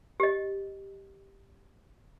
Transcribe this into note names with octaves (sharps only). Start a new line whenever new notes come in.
G4 D#5